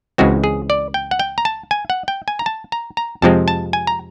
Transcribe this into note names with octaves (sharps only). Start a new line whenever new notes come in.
C#2 C#3 E3 G#3 C4 F#4
G#4
D5
G5
F#5
G5
A#5
A5
G#5
F#5
G5
G#5
A#5
A5
A#5
A#5
F2 C3 F3 G#3 C4 A5
A5
G#5
A#5